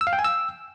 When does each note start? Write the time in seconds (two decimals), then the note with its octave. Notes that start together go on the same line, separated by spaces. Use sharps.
0.01 E6
0.07 F5
0.13 G5
0.19 G#5
0.25 E6